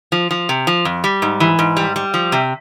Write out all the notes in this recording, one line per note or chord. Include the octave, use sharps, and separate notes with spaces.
F3
F3
C3
F3
F2
G3
G#2
E3
G#2
G3
G3
F3
C3